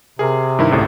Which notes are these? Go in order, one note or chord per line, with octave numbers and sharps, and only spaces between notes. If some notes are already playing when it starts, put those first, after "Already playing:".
C3 G#4 A#4
G2 D#3 E4
G#1 C#2 A2